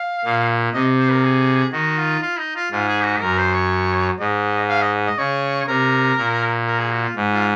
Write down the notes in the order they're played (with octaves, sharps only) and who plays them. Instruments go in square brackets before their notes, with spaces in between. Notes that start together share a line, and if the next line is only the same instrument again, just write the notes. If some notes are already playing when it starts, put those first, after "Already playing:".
Already playing: [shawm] F5
[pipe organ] A#2
[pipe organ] C3 [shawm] D#5
[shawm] C5
A#4
G#4
[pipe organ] D#3 [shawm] F#4
[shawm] F4
F4
D#4
F4
[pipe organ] G#2 [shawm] F4
[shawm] G#4
F#4
[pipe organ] F#2 [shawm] A#4
[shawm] C5
C#5
[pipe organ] G#2 [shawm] D#5
[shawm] F5
D#5
D#5
[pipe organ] C#3 [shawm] C#5
[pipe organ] C3 [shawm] A#4
[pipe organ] A#2
[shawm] A#4
G#4
F#4
F4
[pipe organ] G#2
[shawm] F4